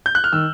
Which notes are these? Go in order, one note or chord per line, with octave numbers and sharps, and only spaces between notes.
G6
F#6
F6
D#3 E6